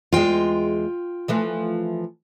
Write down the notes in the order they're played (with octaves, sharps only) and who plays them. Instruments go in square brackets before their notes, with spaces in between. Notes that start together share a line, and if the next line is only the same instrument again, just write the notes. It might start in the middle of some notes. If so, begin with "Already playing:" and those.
[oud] E2 G#3 [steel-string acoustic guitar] F4 G5
[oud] E3 F3 A3